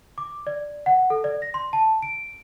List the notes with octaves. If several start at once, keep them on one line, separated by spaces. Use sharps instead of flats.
D6
D5
F#5
A4
D5
A#6
C6
A5
D7